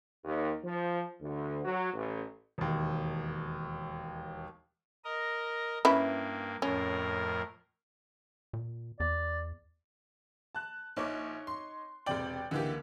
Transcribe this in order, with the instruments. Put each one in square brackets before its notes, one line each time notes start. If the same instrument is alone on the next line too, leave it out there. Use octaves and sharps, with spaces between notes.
[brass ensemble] D#2
F3
D2
F#3
A1
[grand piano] E1 D#2
[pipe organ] A#4 D#5
[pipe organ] G2 A#3 [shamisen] C#4 E4 B4
[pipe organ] F2 A2 A#4 [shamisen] C#4
[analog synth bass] A#2
[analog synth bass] E2 [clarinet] D5
[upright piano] A5 F#6
[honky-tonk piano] A#1 [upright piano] D#4 C#5 D6
[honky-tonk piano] C6
[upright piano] E1 C3 F#7 [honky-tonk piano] D5 G5
[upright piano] C#2 A#3 [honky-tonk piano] D3 E3 G4